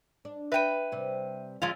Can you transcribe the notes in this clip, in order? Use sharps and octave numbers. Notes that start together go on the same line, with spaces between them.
D4
B4 E5 G5 D#7
C3 G3
F3 G#3 C#4 F4 E5